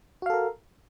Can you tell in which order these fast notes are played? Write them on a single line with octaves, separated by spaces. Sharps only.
F#4 F5 A4 A#4